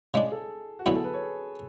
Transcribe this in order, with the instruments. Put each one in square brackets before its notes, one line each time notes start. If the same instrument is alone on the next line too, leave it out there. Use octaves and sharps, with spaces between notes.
[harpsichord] C#3 G#3 D4 [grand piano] G#4
[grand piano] A4
F#4
[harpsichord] D3 F#3 B3 E4 [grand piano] G#4
[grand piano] A4
B4
C#5
G#4